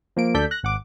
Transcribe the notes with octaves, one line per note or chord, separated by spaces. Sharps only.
F3 A#3 D7
D2 D4 A4 D5 G6 B6
F#6 A#6
G#1 F#5 D6